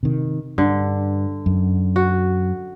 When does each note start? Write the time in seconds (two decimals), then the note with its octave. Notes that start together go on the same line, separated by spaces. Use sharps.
0.03 C3 D#3
0.58 G2 D3
1.46 F#2
1.96 F#4